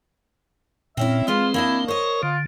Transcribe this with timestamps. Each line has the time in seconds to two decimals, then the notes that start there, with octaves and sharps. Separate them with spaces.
0.97 A#2 C4 C#4 E4 E5
1.28 G#3 C4 F4 B4 C5
1.54 A#3 D4 E4 D#5
1.88 A#4 C5 C#5 D#5
2.23 D3 F4